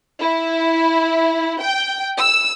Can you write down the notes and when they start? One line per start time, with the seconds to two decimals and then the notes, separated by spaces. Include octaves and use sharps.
0.20 E4
1.61 G5
2.18 E6